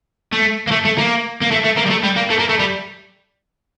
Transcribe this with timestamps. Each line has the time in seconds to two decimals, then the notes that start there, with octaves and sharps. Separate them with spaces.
0.32 A3
0.67 A#3
0.71 A3
0.85 A3
0.98 A#3
1.41 A#3
1.51 A3
1.64 A3
1.77 A#3
1.86 G3
1.90 A3
2.03 G3
2.16 A#3
2.30 A3
2.39 A#3
2.49 A3
2.59 G3